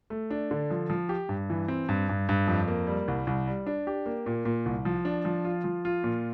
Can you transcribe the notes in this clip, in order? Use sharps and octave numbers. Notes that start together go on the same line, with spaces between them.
A3
D4
D3
F3
F3
G4
G2
E3
C4
G2
G2
G2
F2
A#3
G3
C2
C2
G3
D4
G4
A#3
A#2
A#2
C2
F3
D4
F3
F4
F3
F4
A#2